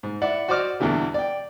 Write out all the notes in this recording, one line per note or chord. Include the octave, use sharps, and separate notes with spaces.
G#2
E4 D5 F#5
F#4 C5 D5 D#5 D6 F6
E2 B2 D3 E3 G3
D5 G5